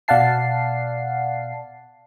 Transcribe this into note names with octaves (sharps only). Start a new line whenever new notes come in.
B2 D5 F5 F#5 A5 C7